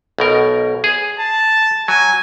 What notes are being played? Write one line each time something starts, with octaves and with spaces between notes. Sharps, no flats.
B1 B2 A#4
G#4
A5
F#3 G#5